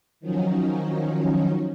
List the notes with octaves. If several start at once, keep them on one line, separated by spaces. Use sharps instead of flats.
D#3 F3 F#3 C#4 D#4